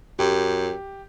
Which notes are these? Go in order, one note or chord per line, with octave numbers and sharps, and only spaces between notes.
F#2 G4